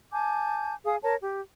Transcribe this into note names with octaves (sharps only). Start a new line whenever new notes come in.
G#5 A5 D6 G6
G#4 F5 D#6
A#4 C#5 A5
G4